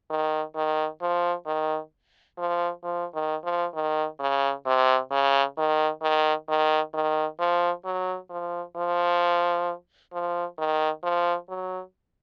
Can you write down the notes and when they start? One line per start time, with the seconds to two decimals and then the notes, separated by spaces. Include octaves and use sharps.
0.10 D#3
0.56 D#3
1.02 F3
1.46 D#3
2.38 F3
2.84 F3
3.14 D#3
3.44 F3
3.74 D#3
4.20 C#3
4.66 C3
5.11 C#3
5.58 D#3
6.02 D#3
6.49 D#3
6.94 D#3
7.39 F3
7.85 F#3
8.30 F3
8.77 F3
10.13 F3
10.58 D#3
11.04 F3
11.49 F#3